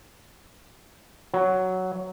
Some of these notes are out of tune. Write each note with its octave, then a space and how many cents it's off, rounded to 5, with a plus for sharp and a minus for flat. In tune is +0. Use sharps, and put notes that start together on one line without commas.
F#3 +5